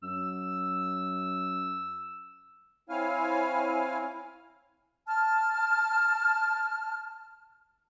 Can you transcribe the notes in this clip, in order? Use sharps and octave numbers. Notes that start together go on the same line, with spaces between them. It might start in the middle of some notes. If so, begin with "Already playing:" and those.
F#2 E6
C4 E4 C#5 F5 G#5 F6
A5 F6